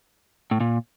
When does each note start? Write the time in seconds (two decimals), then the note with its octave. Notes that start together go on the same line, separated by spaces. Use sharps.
0.51 A2
0.60 A#2